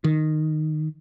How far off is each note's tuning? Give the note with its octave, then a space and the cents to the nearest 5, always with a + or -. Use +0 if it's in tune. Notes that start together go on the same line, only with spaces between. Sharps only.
D#3 -10